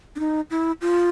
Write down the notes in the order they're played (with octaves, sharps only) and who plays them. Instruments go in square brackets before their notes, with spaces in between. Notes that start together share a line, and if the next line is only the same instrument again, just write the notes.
[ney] D4
D#4
E4
F4